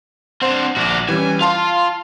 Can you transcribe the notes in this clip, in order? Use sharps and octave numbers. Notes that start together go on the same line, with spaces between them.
C4 D4 C5 F#5
A#1 F#4 D5
E3 G3 C#4 G#5
F4 F5 A5 C6